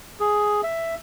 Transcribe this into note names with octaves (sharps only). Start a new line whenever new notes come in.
G#4
E5